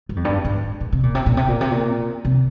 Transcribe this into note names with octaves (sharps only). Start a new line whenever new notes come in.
G2
F2
G2
G#2
A#2
C3
A#2
C3
A#2
C3
A#2
C3
A#2
C3